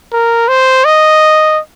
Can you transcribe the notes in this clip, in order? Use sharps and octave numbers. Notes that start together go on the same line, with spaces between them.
A#4
C5
D#5